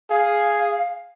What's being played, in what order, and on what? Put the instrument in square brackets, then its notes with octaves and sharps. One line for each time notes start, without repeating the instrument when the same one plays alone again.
[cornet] G#4 [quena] F5